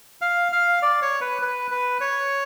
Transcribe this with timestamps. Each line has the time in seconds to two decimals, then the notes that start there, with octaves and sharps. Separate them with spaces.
0.21 F5
0.52 F5
0.82 D5
1.02 C#5
1.21 B4
1.42 B4
1.71 B4
2.01 C#5